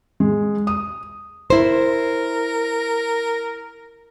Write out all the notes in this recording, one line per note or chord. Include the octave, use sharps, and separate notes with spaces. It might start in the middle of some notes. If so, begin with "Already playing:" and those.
G#3
D#6
E4 A#4 C5